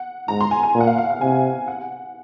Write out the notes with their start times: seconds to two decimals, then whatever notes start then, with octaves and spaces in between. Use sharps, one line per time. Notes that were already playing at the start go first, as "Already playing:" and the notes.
Already playing: F#5
0.28 G#2 A#5
0.41 C6
0.51 G#5
0.63 G#5
0.74 A#2
0.80 F#5
0.87 F5
0.98 F5
1.10 F#5
1.21 C3 G#5
1.68 F#5